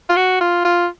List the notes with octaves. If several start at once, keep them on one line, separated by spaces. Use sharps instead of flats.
F4
F#4
F4
F4